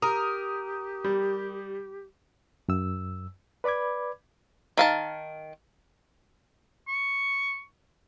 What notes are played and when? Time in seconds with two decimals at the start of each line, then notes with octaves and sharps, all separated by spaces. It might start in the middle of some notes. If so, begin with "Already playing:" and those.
0.02 G4 A#4 D#6
1.04 G3
2.69 F#2 E6
3.64 B4 D5 B5 D6 G#6
4.77 D#3 F5 A5
6.88 C#6